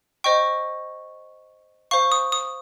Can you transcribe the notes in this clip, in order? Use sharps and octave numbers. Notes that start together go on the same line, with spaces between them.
C5 D#5 G5 C#6
C5 F5 C#6
D#6
D#6